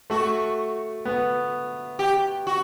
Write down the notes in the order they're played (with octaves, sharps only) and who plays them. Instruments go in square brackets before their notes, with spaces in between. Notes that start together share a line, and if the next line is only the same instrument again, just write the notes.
[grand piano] A3 [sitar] F#4
[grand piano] B3
[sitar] G4
F#4